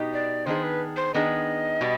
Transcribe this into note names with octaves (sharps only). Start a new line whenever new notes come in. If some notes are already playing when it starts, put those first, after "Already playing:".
Already playing: B2 B3 D#4 G4
D5
D#3 B3 D4 G#4 C5
B4
C5
D#3 B3 D4 G#4 D#5
B2 G3 B3